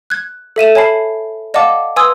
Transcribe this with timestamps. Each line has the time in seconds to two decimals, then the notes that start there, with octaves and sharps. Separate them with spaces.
0.10 F#6 G#6
0.56 A4 E5 D#7 E7
0.75 C#5 G#5 A5 B5 C7
1.54 D5 D#5 F5 F#5 A5 D6
1.96 B4 G#5 C6 D#6 E6 G#6